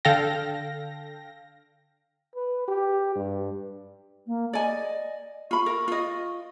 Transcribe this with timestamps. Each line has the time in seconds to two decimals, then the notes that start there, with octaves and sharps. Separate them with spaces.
0.05 D3 A4 F5 G5 A#6
2.36 B4
2.68 G4
3.15 G2
4.26 A#3
4.53 D5 D#5 G#5
5.51 F4 B5 C#6
5.66 A#4
5.88 F4 D#5